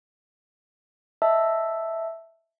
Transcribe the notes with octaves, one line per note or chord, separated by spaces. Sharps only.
D#5 E5 A5 E6